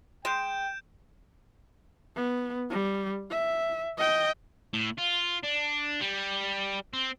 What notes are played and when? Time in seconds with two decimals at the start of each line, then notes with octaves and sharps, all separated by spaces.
0.25 G#3 G5 G6 D7 E7
2.16 B3
2.70 G3
3.30 E5
3.97 D#5 G5
4.73 A2
4.98 F4
5.43 D4
6.01 G3
6.93 C4